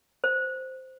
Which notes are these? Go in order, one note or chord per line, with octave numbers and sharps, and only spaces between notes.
C5